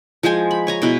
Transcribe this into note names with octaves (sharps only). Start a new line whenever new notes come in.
F3 G#3 C5 G#5
B5
C#5 G#5 A#5
B2 E4 B4